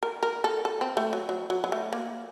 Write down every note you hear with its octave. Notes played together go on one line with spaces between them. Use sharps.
A#4
A#4
A4
A4
C4
A3
F#3
F#3
F#3
F#3
A3
A#3